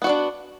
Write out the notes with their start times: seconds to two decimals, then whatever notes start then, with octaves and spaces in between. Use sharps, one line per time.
0.02 B3
0.04 F#4
0.07 D5
0.09 D4